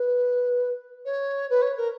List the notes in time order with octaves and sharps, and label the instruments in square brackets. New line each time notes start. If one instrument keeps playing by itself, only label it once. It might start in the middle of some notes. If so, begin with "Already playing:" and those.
Already playing: [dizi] B4
C#5
B4
C#5
A#4